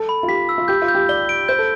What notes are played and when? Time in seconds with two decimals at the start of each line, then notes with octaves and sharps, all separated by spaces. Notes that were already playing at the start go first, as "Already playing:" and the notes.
Already playing: A4
0.09 B5
0.23 F4
0.28 G4 B6
0.49 E6
0.58 F4
0.68 G4 G6
0.82 F4
0.88 G6
0.95 G4
1.09 D5 G7
1.29 D7
1.49 C5 G6
1.59 A4